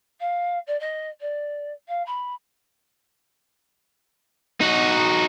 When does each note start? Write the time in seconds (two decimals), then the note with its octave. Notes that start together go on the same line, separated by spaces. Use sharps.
0.20 F5
0.66 D5
0.79 D#5
1.20 D5
1.88 F5
2.06 B5
4.61 D#4 F#4